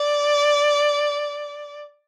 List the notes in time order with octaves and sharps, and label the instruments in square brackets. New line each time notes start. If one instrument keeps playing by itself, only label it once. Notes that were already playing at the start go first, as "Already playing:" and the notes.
Already playing: [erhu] D5